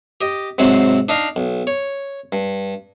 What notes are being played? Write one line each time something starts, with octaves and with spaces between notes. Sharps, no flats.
G4 D#5
G#2 C3 F#3 C4
D4 D#4 D#5 F5
B1
C#5
G2